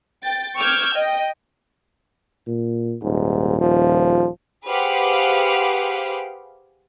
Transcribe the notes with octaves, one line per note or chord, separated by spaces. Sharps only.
G5 A6
C#6 D6 E6 F6 G6 G#6
D#5 G5
A#2
D#1 G#2
F3
G4 G#4 B4 C5 F5 F#5